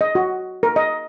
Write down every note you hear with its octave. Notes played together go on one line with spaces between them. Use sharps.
D#5
F#4
A#4
D#5